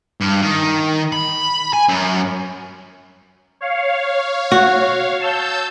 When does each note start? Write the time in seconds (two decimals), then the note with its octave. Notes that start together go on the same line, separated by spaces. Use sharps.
0.21 G2
0.42 D#3
1.12 B5
1.73 G#5
1.88 F#2
3.61 C#5 F5
4.52 F#4
5.21 A5 E6 G6